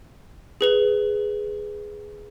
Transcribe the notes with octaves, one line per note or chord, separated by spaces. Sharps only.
G#4 B4 F7